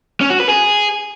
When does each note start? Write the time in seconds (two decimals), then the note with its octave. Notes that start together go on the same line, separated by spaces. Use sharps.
0.21 C#4
0.30 F#4
0.40 B4
0.49 G#4